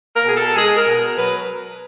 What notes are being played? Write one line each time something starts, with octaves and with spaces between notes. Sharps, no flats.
A#4
B2 G#4
A4
G#3 G#4
A#4
B2
F#3 B4